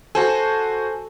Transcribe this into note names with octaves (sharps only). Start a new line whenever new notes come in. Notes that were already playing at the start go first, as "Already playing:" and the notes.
F#4 A4 C5 G#5